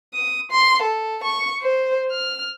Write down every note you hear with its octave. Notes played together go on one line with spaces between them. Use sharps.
D#6
C6
A4
C#6
C5
F6